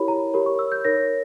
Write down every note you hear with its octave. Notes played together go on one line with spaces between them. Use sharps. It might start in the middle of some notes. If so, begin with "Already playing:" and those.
Already playing: E4 G4 A#4 C#5 B5
A#5
G4 A#4 C#5 B5
C#6
E6
G6
D#4 A#4 C#5 A#6